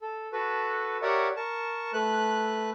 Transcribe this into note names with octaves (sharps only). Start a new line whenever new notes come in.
A4
F#4 A4 B4
G4 A#4 C#5 D5 E5 F#5
A#4 A5 C#6
A3 B4 F#6